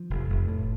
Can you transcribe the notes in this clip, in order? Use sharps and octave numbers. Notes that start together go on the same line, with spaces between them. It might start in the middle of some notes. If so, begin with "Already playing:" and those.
Already playing: F3
F1
F1
A2